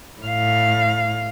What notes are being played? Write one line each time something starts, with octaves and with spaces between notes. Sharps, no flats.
A2 F5